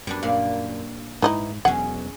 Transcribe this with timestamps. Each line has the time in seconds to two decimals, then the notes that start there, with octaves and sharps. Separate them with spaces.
0.07 F#2 G3 B3 D4
0.23 A#2 A#3 D5 F5
1.22 G#2 E3 D#4 E4
1.65 E1 E2 F#3 C#4 G#4 F#5